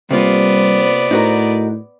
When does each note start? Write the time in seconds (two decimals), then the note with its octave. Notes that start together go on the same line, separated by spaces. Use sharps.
0.11 C3 G3 A#3 B3 F4 C5 D5
1.11 A2 D#4 F#4 A#4